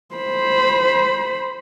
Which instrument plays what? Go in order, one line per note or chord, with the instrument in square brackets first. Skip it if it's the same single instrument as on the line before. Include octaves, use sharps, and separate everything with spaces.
[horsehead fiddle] C5 B5